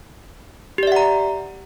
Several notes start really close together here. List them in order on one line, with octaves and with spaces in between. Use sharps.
G4 D5 E5 F#5 A#5